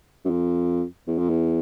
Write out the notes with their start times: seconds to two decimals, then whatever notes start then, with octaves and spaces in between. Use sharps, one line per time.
0.25 F#2
0.30 F2
1.07 E2
1.18 F2
1.30 E2